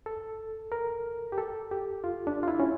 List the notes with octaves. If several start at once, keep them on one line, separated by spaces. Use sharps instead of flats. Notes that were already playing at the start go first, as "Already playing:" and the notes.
A4
A#4
G4
A4
G4
F4
D4
F4
E4
C#4